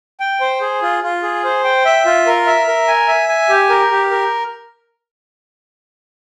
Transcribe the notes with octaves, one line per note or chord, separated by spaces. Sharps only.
G5
C5
G#4
F4
F4
G#4
C5
G5
E5
F4
A#4
E5
A#4
G#5
E5
G#5
G4
A#4
G4
A#4